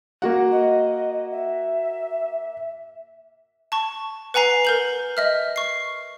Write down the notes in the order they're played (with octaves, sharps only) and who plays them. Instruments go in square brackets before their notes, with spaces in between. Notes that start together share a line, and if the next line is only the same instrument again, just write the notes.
[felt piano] A#3 F#4 F#5
[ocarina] D#5
E5
[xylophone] A5 C#6
B4 F#5 G#5 A#5 C7
A#4 G6 F#7
D#5 E5 F6
C#6 C7